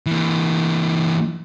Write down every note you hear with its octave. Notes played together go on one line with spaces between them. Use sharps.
E3 A#3